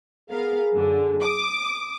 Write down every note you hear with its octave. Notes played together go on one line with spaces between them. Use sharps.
B3 G#4 A#4 F5
F#2 D3
D6 D#6